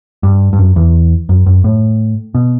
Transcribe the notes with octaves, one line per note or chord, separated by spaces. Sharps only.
G2
G2
F#2
E2
F#2
F#2
A2
B2